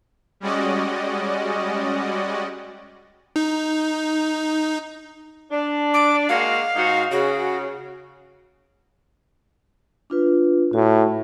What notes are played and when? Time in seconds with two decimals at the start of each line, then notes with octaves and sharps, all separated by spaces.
0.40 G3 G#3 C#4 F#4 D5 D#5
3.36 D#4
5.51 D4
5.94 D6
6.29 G#3 A#3 F#4 F5
6.75 G#2 D#4 F#4
7.11 C#3 F#4
10.10 D4 F4 B4
10.73 A2 F#4